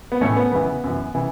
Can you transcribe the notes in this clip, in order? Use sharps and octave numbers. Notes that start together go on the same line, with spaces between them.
B3
A2 E3 A3 C#4
B3
E2 C#3 E3 B3
F#2 E3
C#3 E3